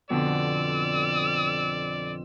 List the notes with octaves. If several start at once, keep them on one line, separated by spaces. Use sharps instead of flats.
F2 B2 D3 D5 E6